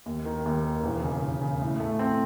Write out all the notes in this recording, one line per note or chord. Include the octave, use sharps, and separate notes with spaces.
D#2
D#3
D#2
D#3
E1
C#3
E1
C#3
A2
A3
C4